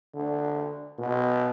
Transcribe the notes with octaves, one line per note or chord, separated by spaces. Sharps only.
D3
B2